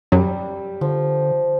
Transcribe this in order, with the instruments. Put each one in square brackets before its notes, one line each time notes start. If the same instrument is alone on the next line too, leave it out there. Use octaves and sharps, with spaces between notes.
[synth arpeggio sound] F#2 F#3 [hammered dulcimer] G3
[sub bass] D3 [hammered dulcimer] F3